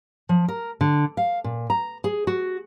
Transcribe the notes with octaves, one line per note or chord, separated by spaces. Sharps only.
F3
A#4
D3
F5
A#2
A#5
G#4
F#4